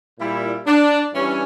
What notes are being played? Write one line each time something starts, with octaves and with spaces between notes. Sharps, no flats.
A#2 G3 E4
D4
G2 E3 G3 C#4